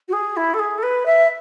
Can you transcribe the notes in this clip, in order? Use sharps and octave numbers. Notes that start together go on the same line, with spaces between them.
F#4
G#4
E4
A4
G#4
A4
B4
E5